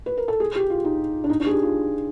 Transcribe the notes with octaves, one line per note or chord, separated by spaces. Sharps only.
B4
A#4
A4
G#4
G4
F4
D#4
D4
D#4
D4
G#4
G4
F4